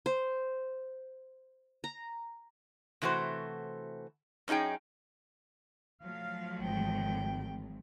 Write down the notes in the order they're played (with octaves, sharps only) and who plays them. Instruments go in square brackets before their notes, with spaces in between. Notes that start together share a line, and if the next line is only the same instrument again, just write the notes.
[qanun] C5
A#5
[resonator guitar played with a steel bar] C3 E3 A3 F#4 C5
F#2 C#4 D#4 G#4 G5
[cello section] F3 F#3 A3 [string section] F5
[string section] G#1 [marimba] E3 G#3 [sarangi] G5